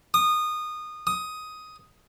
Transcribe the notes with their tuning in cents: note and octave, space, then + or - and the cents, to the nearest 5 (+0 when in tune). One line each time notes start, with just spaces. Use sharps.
D#6 -20
D#6 +10